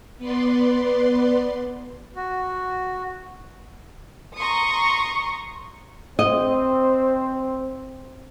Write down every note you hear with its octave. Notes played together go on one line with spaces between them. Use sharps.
B3 B4 D5 C6
F#4
A#5 C6 C#6 D#6
C4 C5 D#5